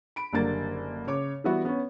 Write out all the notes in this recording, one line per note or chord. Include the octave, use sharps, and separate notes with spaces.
B5 D7
F#1 D3 G3 A#3 A6
C#3 C#5 D6
E3 G3 B3 F#4 E5
B3 C#4